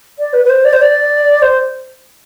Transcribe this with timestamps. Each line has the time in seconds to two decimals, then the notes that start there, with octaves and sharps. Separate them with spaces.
0.19 D5
0.33 B4
0.44 B4
0.49 C5
0.64 D5
0.72 C5
0.81 D5
1.42 C5